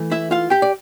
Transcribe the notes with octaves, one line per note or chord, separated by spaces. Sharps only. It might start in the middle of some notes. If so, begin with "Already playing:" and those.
Already playing: E3 A3
E4 E5
F4 F5
G4 G5
D5